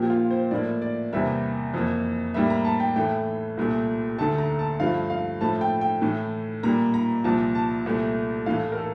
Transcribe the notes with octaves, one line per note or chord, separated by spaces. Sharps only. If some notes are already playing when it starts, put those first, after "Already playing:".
Already playing: A#2 F3 A#3 G4
F4
C5
A2 F3 A#3 D5
D5
E2 C3 G3 A#3 E5
F2 E3 A#3
A2 G3 A#3 E5
A#5
A5
G5
A2 E3 A3 G5
C2 A#2 A3
D2 D3 A3 A5
A#5
A5
G2 F3 A3 F5
F5
A2 F3 A3 A5
G5
G5
A2 E3 A3
A#2 G3 A#3 A#5
A#5
C2 A#2 F3 A5
A5
C2 A#2 A3
A2 E3 A3 F5
A#4
A4